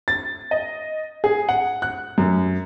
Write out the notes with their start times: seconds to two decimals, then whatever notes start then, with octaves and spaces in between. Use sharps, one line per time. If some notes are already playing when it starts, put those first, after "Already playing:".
0.08 A6
0.51 D#5
1.24 G#4
1.49 F#5
1.82 F#6
2.18 F#2